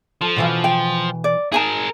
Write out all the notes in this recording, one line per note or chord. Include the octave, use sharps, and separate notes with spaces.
F3 A4
B2 E3 F5
G5
D5
D#4 G#4 A#4 G#5 A5